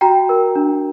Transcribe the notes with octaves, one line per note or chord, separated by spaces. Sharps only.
F#4 G5 A#5
A#4
D4